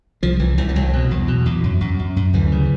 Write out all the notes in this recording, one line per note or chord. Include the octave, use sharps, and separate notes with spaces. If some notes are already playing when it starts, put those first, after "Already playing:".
C2 F3
C2 E3
C2 E3
G3
C2 F#3
B2
E2
B2
E2
F#2
F#2
F#2
F#2
D2 E3
C#3